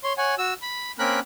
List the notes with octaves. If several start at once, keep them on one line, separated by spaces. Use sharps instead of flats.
C#5 C6
C#5 F#5 G#5
F#4 E6
B5
A#3 C4 C#4 A#4 B5 F#6